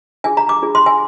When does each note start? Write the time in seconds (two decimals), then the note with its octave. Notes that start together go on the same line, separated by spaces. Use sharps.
0.24 D4 F4 G#4 G#5
0.37 A#5
0.49 D6
0.62 D4 F4 G#4
0.75 C6
0.86 G#5